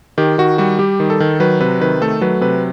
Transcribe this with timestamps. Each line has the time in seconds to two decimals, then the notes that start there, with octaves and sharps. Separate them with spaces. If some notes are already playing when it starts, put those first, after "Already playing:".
0.18 D#3 G4
0.38 D#3 F#4
0.58 G3 F#4
0.79 G3 G4
1.00 D#3
1.10 A4
1.20 D#3
1.40 F#3 B4
1.61 C3 B4
1.80 D#3 B4
2.02 A3 A4
2.21 F#3 B4
2.41 C3 B4